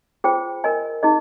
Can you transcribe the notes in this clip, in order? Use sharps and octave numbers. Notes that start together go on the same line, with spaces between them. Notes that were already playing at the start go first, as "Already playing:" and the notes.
F4 G#4 C5 G5
A#4 D#5 G#5
D#4 G#4 D#5